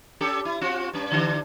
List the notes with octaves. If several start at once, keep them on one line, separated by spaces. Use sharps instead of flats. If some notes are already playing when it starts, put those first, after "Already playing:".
C#4 G4 A4
E4
C4 F4 F#4
G2 C#4
D3 E3 D4